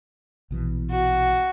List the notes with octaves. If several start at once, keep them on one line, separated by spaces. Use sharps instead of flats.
A#1 B2 E3
F#4